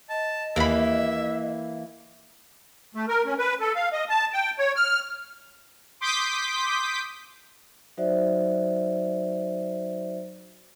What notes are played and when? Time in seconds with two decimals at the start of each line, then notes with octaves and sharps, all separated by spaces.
0.09 D#5 A5
0.56 D#2 E3 A#3 E5 B5
2.95 A3
3.08 A#4
3.26 C#4
3.38 B4
3.61 A4
3.75 F5
3.93 D#5
4.09 A5
4.33 G5
4.59 C#5
4.76 F6
6.01 C6 D6 D#6 G6 B6
7.97 F#3 D#4 F#4 C5 D5 E5